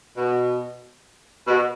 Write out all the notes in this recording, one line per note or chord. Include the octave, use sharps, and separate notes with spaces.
B2
B2